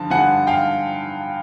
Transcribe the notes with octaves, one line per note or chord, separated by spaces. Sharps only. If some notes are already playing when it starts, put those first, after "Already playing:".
Already playing: G2 D3 F3 A5
G2 D3 F3 F#5 G#5
F5 G5